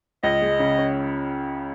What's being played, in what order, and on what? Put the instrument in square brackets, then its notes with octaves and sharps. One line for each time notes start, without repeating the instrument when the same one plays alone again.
[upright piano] C#2 [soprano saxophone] D#5
[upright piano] G#3
C#3
C#4